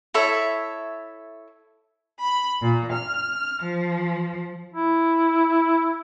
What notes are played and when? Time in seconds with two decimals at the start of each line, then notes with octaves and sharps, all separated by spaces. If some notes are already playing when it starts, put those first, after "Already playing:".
0.14 E4 A4 C#5 E5
2.21 B5
2.62 A#2
2.93 F6
3.63 F3
4.74 E4